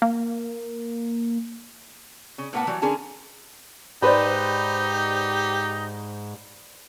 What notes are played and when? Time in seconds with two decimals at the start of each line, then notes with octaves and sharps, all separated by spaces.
0.02 A#3
2.38 C#3
2.53 A2 A#3 B3 B4 F#5 A5
2.67 E3 F#3 G3
2.82 D3 C#4 G#4 A#4 A5
4.02 G#2 D#4 G4 B4 C5 D5